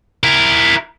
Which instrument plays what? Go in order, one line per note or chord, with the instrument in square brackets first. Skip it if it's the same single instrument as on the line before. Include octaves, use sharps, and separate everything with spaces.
[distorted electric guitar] E4 A#4